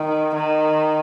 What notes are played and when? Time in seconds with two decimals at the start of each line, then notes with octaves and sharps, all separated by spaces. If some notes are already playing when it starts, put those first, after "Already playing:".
Already playing: D#3
0.36 D#3